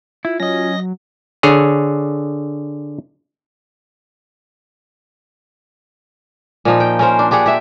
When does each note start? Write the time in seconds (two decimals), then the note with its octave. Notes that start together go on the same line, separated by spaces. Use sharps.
0.25 E4 F4
0.40 F#3 C#4 D#5 A#6
1.43 D3 G#4 C#5
6.65 A#2 F3 D#4
6.80 G5
6.99 C#4 A#4 C5
7.19 D4
7.31 D4 G4 G#4 F#5
7.46 G4 E5